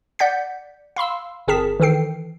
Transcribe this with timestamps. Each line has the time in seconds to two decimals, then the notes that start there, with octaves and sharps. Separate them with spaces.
0.19 D5 F#5 G6 B6
0.96 F5 B5 C6 E6
1.48 G1 C4 G#4 A#4 A5 B6
1.80 D#3 E3 A4 G5 C7